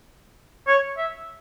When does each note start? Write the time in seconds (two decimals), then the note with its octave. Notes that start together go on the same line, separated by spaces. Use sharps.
0.68 C#5
0.98 E5